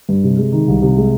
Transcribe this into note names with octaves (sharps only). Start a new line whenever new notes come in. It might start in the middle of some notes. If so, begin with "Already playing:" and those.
G2
C3
G#3
D#3
C2
C3
G#3